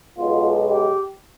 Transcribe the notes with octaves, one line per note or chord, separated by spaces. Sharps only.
B1 B2 G#3 B3 F4
G4